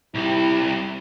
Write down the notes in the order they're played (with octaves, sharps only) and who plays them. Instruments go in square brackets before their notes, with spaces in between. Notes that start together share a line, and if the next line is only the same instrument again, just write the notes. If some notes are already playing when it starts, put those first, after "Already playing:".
[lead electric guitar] C2 G3 [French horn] E4